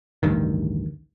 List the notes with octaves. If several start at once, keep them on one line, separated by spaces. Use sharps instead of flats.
A1 D2 G2 D#3